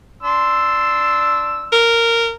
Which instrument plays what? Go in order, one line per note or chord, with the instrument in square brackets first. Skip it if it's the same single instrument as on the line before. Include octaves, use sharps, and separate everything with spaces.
[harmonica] D4 C6 E6
[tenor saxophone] A#4